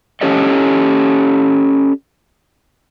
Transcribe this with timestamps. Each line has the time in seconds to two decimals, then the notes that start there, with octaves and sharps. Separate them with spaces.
0.21 C#4 G4 A4 C#5 D#5